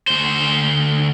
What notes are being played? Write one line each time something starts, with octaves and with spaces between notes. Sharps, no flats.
D2 C5